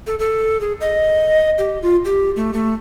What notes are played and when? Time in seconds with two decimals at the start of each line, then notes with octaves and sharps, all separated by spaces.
0.07 A4
0.19 A4
0.61 G#4
0.81 D#5
1.58 G4
1.82 F4
2.05 G4
2.36 A3
2.53 A3